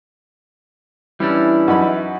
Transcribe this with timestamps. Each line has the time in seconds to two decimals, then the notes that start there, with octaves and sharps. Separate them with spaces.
1.20 E3 G3 C#4 D4 E4
1.68 F#2 D#4 B5